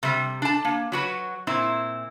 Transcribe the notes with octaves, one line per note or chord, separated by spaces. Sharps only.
C3 G3
D4 A5
A#3
F#3 F#4 B4
A#2 C4 E4